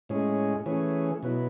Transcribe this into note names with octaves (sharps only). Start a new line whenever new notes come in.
A2 G#3 C#4 G#4
E3 A3 C#4 G#4
B2 F#3 B3 E4